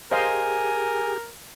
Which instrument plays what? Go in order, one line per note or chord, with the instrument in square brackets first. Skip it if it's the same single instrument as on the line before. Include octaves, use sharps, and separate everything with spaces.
[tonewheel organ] G4 G#4 [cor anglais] A#4 [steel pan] C5 D#5 F5 [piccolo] G#5